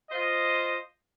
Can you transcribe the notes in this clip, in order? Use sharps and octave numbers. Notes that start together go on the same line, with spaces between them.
F4 C5 D#5